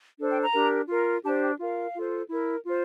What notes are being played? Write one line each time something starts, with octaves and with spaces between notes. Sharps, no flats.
D4 A4 C5
G5
A#5
D4 G4 A#4
F4 A#4
D4 G4 C5 A5
G5
F4 A#4 F5
F4 A4 C5
E4 A#4
F4 C5